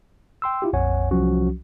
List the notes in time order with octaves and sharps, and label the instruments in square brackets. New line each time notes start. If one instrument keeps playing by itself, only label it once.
[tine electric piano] G5 C6 E6
E4 F4 G4
A#1 F2 C#5 F#5 G#5
C2 F3 F#3 C#4 F#4